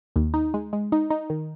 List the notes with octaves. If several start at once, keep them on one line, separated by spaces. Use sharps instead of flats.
D#2
D#4
G#3
G#3
D#4
D#4
D#3